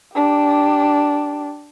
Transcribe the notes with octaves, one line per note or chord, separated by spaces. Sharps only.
D4 G4